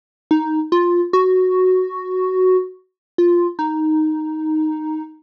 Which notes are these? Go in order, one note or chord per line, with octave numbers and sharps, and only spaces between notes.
D#4
F4
F#4
F4
D#4